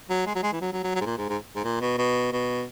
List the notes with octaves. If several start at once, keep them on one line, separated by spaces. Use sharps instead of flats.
F#3
G#3
F#3
G#3
E3
F#3
F#3
F#3
F#3
G#2
A#2
G#2
G#2
G#2
A#2
B2
B2
B2